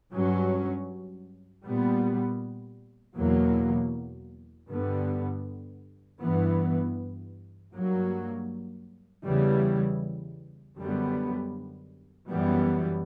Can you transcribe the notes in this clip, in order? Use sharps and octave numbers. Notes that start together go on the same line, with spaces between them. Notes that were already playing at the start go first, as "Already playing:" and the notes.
G2 F#3 C#4
A#2 G3 B3
E2 B2 F#3 A#3
G2 D3 G3 B3
G2 E3 B3
G2 F#3 A#3
E2 C#3 E3 G3
F#2 D3 G3 B3
F#2 E3 G3 B3